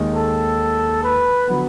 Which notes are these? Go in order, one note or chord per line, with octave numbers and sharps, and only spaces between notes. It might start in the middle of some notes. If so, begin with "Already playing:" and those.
Already playing: D#2 D#3 G#3
A4
B4
D3 F#3 B3